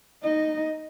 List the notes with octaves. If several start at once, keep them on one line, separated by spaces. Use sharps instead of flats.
D#4 D#5